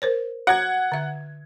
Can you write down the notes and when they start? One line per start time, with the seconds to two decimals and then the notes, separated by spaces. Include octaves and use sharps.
0.02 A#4 C5 C#5
0.47 F#4 C#5 F#5 A#5 G#6
0.92 D3 E5